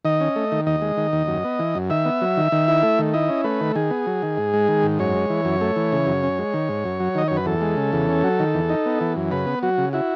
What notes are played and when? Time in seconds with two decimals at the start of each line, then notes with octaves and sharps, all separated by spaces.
0.05 D#3 D#5
0.21 C#4
0.36 A3
0.52 D#3
0.66 D#2 D#5
0.82 G#3
0.97 D#3
1.13 D#2
1.28 F#2
1.44 B3
1.59 E3
1.75 F#2
1.90 D#3 E5
2.05 B3
2.21 F#3
2.37 D#3
2.52 D#3
2.68 E4
2.83 A3
2.99 D#3
3.14 E4 D#5
3.29 C#4
3.44 A3 B4
3.61 D#3
3.75 D#3 G#4
3.90 B3
4.07 F#3
4.23 D#3
4.37 G#2
4.53 G#3
4.68 D#3
4.83 G#2
4.99 F#2 C#5
5.14 G#3
5.30 E3
5.45 F#2
5.61 A3
5.76 E3
5.92 C#3
6.07 F#2
6.23 C#4
6.39 G#3
6.54 D#3
6.69 G#2
6.85 F#2
7.00 F#3
7.15 D#3 D#5
7.28 F#2 C#5
7.37 B4
7.46 E2 A4
7.61 G#3
7.77 C#3
7.93 E2
8.08 C#4
8.24 F#3
8.40 D#3
8.55 E2
8.69 D#4
8.86 B3
9.01 E3
9.16 F#2
9.31 C#3 B4
9.47 B3
9.63 F#3 F#4
9.78 C#3
9.93 E4 F#4